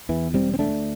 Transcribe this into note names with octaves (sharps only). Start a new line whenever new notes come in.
E2 E3
E1 G3 C4
C4
D2 A3 D4